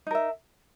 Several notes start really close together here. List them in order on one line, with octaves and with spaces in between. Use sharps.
D#4 A#4 E5